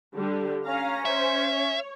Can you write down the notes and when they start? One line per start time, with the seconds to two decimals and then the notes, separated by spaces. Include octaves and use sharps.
0.15 D3 G3 G4
0.65 C#4 F5 A#5
1.05 C5 E5
1.54 C#5